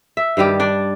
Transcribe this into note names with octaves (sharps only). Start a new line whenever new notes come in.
E5
G2 D#3 G3 G4
D4 D5